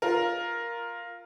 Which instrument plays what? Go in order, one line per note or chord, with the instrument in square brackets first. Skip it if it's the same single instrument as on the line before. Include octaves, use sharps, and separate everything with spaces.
[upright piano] F4 A#4